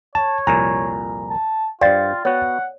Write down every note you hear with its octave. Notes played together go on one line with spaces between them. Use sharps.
C#5 A5
C2 F2 A#2 G#5 A#5
A5
G2 F4 C5 D5 F5 G5 A6
B3 F#4 C#5 F#5